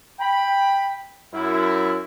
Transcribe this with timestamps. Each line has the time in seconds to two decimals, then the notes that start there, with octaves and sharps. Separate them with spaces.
0.20 G5 B5
1.34 F#2 E4